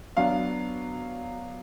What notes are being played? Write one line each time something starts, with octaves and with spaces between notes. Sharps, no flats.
F#3 B3 D4 F5